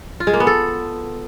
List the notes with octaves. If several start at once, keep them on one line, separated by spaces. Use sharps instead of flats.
F4
G#3
A#3
B3
A4